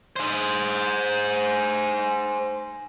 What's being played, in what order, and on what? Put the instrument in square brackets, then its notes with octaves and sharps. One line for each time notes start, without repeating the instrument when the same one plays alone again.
[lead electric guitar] G#4 C5